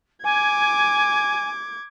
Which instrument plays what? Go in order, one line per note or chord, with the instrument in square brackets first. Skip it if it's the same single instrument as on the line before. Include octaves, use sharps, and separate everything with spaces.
[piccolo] G#5 [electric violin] D6 G#6